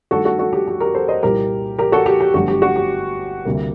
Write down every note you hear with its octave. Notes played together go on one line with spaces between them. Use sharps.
G2 D#3 A3 F#4 A4
F#4 A4
F#4 A4
G4
G4
G4 A#4
A4 C5
C5 D#5
C2 A#2 G3 A#3 G4 A#4
G4 A#4
F#4 A4
G4
G4
G1 G2 F#3 A3 F#4
G4
F#4
G4
D2 C3 G3 A#3